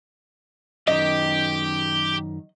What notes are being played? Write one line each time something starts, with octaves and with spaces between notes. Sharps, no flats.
F#2 D#3 G4 D#5